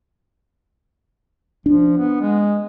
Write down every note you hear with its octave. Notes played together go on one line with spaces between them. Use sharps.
F3 D4
B3
G#3